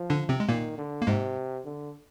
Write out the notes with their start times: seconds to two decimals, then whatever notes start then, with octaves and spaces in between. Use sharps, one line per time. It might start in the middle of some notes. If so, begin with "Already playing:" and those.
Already playing: F3
0.10 D3 D4
0.29 C3 C4
0.40 G#3
0.49 A#2 D#3 A#3
0.78 D3
1.02 A#3
1.07 G#2 C3 G#3
1.65 D3